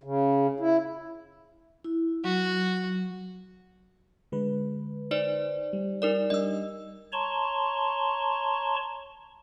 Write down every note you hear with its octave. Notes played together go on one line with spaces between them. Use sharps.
C#3
E4
E4
F#3 F#4
D3 G#3 B4
D#4 C5 D5
G3
D#4 A#4 D5
G3 D4 D#5 E6
C#5 A5 A#5 C6 C#6